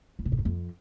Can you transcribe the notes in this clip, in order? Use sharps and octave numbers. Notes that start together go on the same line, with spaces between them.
E2
C3
G#2
F#2
F2